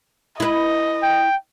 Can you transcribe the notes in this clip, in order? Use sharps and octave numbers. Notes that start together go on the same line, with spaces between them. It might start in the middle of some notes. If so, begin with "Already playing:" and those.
E4 B4 D#5
G5